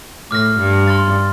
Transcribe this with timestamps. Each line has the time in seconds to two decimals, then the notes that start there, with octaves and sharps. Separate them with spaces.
0.30 A2 D6 F6 A#6
0.59 G2
0.87 C6 F6 A6